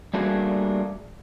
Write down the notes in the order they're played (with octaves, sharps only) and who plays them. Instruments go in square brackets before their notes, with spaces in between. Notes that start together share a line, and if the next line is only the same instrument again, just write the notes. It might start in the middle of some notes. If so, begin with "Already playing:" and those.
[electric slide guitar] G3 A3 A#3 D4 F#4 G#4